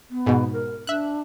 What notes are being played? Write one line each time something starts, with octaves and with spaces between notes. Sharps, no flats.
B3
G#2 B2
A#4
D4 E5 F#6